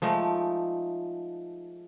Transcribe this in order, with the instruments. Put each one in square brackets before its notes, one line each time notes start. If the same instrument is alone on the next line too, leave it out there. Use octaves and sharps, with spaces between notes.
[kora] F3 G#3 A3 D#4